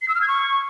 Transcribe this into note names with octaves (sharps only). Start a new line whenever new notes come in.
C7
E6
F6
G#6
C#6